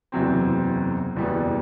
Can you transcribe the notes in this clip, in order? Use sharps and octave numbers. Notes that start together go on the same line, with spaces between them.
F#1 E2 C3 F#3 C4
F#1 E2 B2 G3